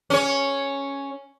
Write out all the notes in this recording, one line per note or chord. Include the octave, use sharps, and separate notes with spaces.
C#4 C#5